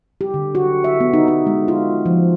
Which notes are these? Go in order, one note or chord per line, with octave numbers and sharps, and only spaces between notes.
G4
D3
F#4
E5
B3
D#4
D#4
G#3
F4
F3